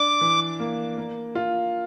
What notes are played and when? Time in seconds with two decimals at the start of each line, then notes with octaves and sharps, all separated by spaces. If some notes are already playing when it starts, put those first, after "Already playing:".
Already playing: D4 D6
0.21 E3
0.60 A#3
0.97 A#3
1.35 F4